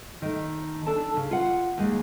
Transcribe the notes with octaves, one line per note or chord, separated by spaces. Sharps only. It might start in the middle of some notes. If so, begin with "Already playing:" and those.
D#3 A3
D4 A4 A5
C#3
F4 F#5
D#2 G#3